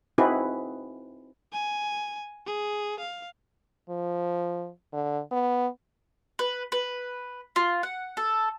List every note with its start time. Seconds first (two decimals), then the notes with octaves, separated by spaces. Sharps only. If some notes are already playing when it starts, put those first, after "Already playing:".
0.18 C4 D#4 E4 F#4 G#4 B4
1.53 G#5
2.46 G#4
2.99 F5
3.89 F3
4.93 D3
5.31 B3
6.39 B4
6.72 B4
7.56 F4
7.83 F#5
8.17 A4